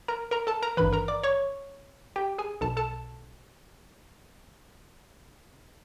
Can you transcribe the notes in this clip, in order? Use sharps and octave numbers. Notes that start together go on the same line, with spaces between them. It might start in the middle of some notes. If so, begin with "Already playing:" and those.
A#4 A#5
A#4 A#5
A4 A5
A#4 A#5
G#1 G2 E3 B4 B5
A#4 A#5
D5 D6
C#5 C#6
G4 G5
G#4 G#5
B1 B2 A4 A5
A4 A5